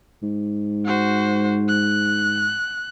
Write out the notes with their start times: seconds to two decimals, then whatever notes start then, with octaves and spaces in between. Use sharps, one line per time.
0.23 G#2
0.86 F#4 C5
1.68 F#6